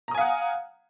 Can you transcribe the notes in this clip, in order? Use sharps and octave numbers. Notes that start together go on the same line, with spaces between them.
F5 F#5 G#5 A#5 D#6